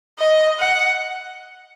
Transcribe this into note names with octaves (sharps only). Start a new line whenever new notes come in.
D#5
F#5